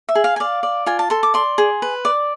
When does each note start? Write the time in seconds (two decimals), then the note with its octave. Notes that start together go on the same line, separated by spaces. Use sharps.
0.09 E5
0.15 G#4
0.24 F5
0.36 G#5
0.40 D5 F5
0.63 D5
0.86 F4 G#5
0.99 A5
1.10 A4 C6
1.23 D6
1.34 D5 C6
1.58 G#4
1.82 B4
2.05 D5